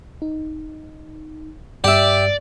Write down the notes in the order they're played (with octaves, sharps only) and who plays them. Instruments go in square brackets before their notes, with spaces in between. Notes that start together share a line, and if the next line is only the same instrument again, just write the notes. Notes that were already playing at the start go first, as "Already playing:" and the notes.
[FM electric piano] D#4
[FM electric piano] G2 [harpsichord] G4 E5 [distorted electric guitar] D5